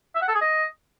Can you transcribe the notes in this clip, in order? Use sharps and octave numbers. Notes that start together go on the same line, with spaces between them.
E5
F#5
A4
G#4
D#5